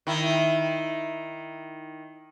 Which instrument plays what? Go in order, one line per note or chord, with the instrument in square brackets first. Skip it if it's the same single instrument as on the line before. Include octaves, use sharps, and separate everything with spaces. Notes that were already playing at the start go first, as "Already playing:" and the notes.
[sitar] D#3 E4